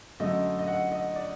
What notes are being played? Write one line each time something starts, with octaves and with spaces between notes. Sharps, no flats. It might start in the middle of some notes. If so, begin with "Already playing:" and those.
F#2 D3 A3 D#5
D#5
F#5
D#5
D5